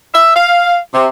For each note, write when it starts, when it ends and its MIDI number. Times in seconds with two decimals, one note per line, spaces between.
0.14 0.31 76
0.35 0.76 77
0.94 1.07 48